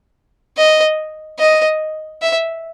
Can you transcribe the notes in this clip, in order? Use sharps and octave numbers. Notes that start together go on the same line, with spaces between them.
D#5
D#5
E5